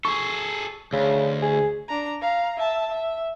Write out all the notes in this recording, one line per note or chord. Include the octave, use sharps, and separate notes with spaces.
G#4 A4 C#6
D2 C#3
G#4
D4 A#5
F5 A#5
E5 A5
E5